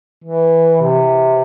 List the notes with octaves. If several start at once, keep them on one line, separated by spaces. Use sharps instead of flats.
E3
C3